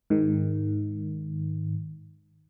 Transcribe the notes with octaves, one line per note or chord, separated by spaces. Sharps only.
G#2 D#3